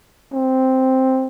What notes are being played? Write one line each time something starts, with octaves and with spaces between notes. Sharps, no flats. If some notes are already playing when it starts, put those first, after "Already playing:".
C4